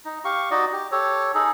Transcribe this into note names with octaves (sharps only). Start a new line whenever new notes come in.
D#4
G4 F5 C#6
D#4 F#4 D5 D#5
G4
G4 A4 C#5
D#4 G#4 A4